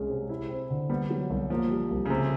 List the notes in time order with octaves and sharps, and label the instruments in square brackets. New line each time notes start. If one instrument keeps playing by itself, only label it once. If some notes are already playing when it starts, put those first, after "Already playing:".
Already playing: [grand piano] C2 G#3 C#4
C3
E4
C4
D3
[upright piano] G3 [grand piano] B3
[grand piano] F#3
C2
[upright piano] F3 [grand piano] A#3
[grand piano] G3
C2
[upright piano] C#3
[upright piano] C3 [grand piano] A3